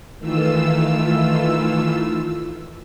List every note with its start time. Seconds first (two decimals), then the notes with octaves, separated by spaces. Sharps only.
0.18 D#3 E3 A3 F4 E6